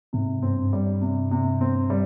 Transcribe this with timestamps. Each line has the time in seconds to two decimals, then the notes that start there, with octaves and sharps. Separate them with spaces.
0.13 G#2 C3
0.42 G2 C4
0.73 G3
1.02 C3
1.31 C3
1.61 C4
1.90 G3